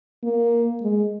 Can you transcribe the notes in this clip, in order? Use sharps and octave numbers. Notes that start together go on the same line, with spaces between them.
A#3
G#3